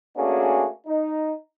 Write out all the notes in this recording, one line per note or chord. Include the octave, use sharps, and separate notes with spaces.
A3 A#3 C#4 D4 F#4 G#4
D#4